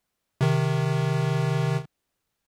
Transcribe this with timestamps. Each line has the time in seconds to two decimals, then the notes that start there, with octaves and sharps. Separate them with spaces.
0.41 C3 D#3